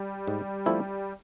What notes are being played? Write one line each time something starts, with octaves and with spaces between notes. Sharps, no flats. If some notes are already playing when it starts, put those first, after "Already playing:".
Already playing: G3
G#2
F3 A3 C4 E4